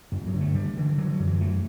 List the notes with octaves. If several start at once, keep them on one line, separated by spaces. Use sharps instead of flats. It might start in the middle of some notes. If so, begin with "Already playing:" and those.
G2 B3
F#3
D3
A3
D3 G3
D3 E3
D3 F#3
F#3
F#2
E3
F#2 A3